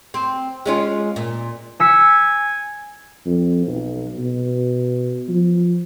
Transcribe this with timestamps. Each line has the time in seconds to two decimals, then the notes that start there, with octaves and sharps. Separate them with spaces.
0.14 C4
0.66 G#3 C#4 F4
1.16 A#2
1.80 G#5 E6 B6 C#7
3.26 F2
3.66 B1
4.18 B2
5.28 F3